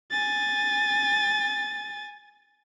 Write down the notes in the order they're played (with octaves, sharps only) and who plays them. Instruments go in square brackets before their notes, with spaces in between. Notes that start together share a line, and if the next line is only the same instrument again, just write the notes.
[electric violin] G#5 A6